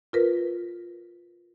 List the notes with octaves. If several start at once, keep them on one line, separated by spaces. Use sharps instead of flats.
F4 A#4 B4